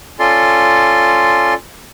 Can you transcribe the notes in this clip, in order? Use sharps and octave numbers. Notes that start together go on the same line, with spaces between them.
C#4 F4 A4 D5 C6